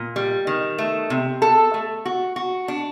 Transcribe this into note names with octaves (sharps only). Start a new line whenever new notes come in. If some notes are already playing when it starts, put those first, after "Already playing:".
Already playing: A#2
G3
D#3
A3
C3
A4
A3
F#4
F#4
D4